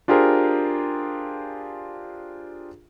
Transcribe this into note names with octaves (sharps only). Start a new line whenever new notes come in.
D4 F4 G4 G#4 A#4 C5